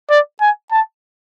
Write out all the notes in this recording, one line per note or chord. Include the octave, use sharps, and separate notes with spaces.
D5
G#5
A5